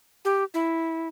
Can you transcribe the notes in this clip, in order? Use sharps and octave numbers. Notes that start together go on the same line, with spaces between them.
G4
E4